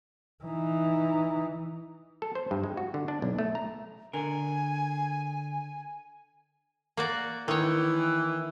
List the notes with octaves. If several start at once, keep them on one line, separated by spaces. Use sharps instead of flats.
E3 D#4
A4
C5
G2
G#3
F#4
D3
D4
B1
A3
A#5
D3 A#4 G#5
A#3 F#4 D5
D#3 E3 C#5